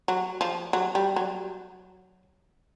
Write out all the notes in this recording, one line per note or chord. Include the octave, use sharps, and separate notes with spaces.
F#3
F3
F#3
G3
F#3